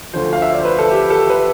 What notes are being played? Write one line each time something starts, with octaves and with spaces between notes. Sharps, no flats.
D2 D3 F3 C5
F5
E5
D5
C5
B4
A4
G4
A4
B4